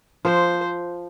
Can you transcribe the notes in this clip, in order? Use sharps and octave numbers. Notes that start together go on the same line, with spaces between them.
F3 C5